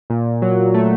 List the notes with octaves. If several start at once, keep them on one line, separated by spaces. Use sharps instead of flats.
A#2
F#3
A3